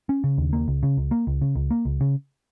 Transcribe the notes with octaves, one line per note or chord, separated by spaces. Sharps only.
C#4
C#3
D#2
A#3
C#2
C#3
C#2
A#3
C#2
C#3
C#2
A#3
C#2
C#3